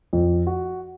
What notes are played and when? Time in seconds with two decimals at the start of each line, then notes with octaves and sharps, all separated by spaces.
0.13 F2
0.47 F#4